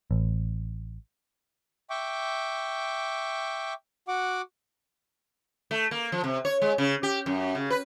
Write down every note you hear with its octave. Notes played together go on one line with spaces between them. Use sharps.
A1
E5 G5 C#6 D6
F#4 F#5 D6
A3
A#3
F3
C3
C#5
G#3
C#3
G4
F#2
C#3
B4